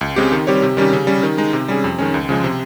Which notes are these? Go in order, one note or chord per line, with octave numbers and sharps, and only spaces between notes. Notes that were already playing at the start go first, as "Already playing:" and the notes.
C#2
C#3 G#3 C4 G4
D#3
G3 C4 G4 C#5
C3
D#3 G3 C#4 G4
C#3
G3 C#4
D#3
G#3 D#4
C3
G3 C#4 G#4
F2
D#3 G#3 C#4
C#2
C#3 F3 G#3
C3